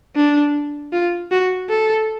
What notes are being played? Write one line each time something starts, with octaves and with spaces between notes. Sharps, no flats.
D4
F4
F#4
A4